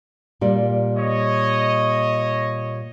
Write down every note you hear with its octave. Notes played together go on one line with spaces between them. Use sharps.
A#2 G3 D5
C#5 D#5